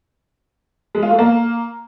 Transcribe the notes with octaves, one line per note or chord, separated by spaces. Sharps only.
G#3
F4
A3
A#3